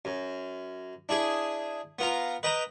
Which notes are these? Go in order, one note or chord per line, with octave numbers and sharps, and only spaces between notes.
F#2
D4 E4 G#4
B3 F4 A#5
B4 D#5 G5 A#5